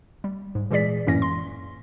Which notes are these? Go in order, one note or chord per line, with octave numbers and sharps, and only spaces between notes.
G3
G#2
A#2 E3 G#3 G#4 D5 B6
F#2 A2 E3 A#3 C#4 A#6
C6